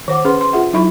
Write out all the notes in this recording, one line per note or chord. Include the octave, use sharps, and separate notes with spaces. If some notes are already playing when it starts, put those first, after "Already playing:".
D#3 C5 F#5 D6
C#4 G#4 B4 F#5 C6
C6
F4 G#4 E5 F#5
F#3 D#4 E4 E5 B5 C#6